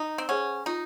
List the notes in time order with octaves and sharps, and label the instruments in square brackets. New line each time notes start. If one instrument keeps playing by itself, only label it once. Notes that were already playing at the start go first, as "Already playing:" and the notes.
Already playing: [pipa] D#4
C4
[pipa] C#4 [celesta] G#4 C5 F#5
[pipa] D#4 [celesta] F4